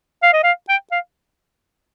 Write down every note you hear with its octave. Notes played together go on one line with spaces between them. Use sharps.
F5
D#5
F5
G5
F5